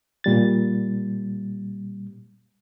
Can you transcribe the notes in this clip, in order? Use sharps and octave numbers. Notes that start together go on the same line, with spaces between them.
A#2 G3 A6